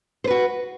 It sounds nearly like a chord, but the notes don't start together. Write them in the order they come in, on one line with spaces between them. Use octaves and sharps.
C5 B4 F#4